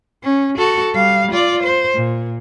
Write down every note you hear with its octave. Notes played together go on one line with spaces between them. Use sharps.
C#4
F#4 A4
G3 F5
F4 D5
C5
A#2